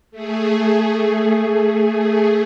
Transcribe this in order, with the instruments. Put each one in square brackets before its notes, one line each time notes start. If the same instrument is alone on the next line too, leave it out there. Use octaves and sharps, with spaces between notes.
[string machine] A3 G#4